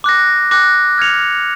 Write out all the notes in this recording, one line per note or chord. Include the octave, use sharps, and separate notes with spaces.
D6 F#6 A#6
D6 F#6 A#6
F6 G#6 C#7 F7